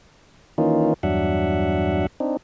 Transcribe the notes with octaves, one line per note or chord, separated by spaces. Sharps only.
D#3 E3 A#3 C#4 D#4 F4
E2 G2 F#3 D4 E5 F#5
C4 D4 D#4